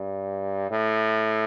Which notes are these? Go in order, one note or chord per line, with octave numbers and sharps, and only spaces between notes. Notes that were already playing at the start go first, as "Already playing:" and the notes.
Already playing: G2
A2